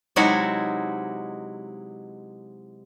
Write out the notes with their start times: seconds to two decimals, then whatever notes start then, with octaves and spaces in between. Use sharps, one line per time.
0.16 C3 F#3 G#3 D#4 E4 F#4